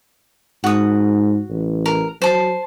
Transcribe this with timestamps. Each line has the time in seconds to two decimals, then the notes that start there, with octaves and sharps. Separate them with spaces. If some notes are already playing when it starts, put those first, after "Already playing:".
0.64 G#2 F#4 D#6
1.50 A1
1.86 A#4
2.22 F#3 C5 A5